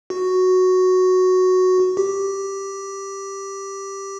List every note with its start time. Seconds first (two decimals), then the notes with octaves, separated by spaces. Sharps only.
0.10 F#4
1.97 G4